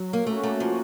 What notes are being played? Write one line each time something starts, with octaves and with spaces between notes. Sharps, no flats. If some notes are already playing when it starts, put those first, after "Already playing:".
Already playing: F#3
A#3
A3 A#3 C#4 F#4
A3
F3